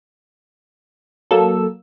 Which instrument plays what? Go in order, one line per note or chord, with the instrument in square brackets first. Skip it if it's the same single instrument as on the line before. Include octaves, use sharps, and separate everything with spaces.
[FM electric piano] F#3 A#3 E6 [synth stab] A4